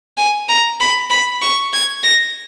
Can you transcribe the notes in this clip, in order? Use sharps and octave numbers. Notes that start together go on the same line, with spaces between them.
G#5
A#5
B5
B5
C#6
G#6
A#6